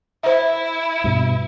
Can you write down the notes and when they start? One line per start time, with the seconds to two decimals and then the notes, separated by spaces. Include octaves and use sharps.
0.23 E4 C5 E5
1.04 G2 B2